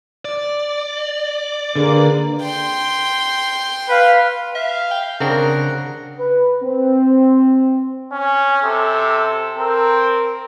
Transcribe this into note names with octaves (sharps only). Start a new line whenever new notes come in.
D5
D3 A#3 G#4 B4
G5 C6
B4 F5
E5 F5
G5
C#3 C4 D4 A#4 F#5
B4
C4
C#4
C3 A4
C4 A#4